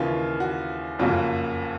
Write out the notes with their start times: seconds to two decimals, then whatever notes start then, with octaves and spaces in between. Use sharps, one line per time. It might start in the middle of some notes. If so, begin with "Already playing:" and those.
Already playing: D#2 C#3 E3 F4
0.40 F#4
0.99 F#1 F2 C#3 F#3 A#3